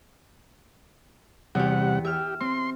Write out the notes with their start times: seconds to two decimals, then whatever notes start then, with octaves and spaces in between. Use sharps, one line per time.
1.55 E2 C3 G3 G4 F#5
2.05 G4 E5 F6
2.41 C4 C6